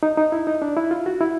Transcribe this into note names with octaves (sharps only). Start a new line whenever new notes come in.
D#4
D#4
E4
D#4
D4
E4
F4
F#4
E4